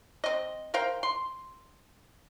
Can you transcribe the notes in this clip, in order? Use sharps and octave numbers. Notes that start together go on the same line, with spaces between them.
C4 D#5
A#4 C5 F5 G5
C6